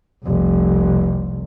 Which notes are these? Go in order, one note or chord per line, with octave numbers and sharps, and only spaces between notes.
F1 C2